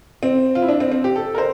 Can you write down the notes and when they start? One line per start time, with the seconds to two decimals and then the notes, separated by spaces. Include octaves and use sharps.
0.23 C4
0.55 F4
0.62 E4
0.69 D4
0.80 C4
0.92 C4
1.04 G4
1.16 A4
1.35 A#4
1.38 C5